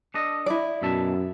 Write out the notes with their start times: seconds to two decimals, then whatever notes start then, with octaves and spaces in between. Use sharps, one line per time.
0.14 D4 A4 D#5
0.46 E4 D5
0.82 F#2 B2 E5 A5